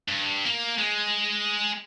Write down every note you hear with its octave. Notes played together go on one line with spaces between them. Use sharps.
G2
A#3
G#3